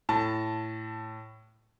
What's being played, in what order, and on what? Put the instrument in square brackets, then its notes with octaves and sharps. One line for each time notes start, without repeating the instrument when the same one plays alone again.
[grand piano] A2 A5